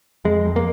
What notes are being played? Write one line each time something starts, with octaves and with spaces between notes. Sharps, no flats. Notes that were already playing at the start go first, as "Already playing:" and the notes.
F2 G#3
F2
A#3